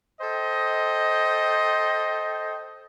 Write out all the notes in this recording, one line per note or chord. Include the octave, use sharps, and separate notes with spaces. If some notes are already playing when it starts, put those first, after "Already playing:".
A4 C5 D#5 G5